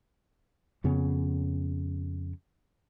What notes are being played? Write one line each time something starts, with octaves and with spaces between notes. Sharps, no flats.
F2 C#3 B3 C#4